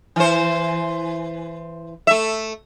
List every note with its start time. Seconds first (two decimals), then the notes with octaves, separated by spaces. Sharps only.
0.16 E3 C5
2.07 A3 E5